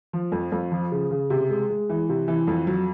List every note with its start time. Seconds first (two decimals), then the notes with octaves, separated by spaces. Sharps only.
0.13 F3
0.32 F2
0.52 F2
0.72 F3
0.92 C#3
1.11 C#3
1.30 C3
1.49 G#3
1.70 G#3
1.90 E3
2.09 C3
2.28 E3
2.47 F2
2.67 F#3